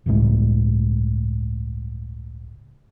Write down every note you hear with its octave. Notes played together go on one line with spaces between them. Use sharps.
G1 C#2 A2 G#3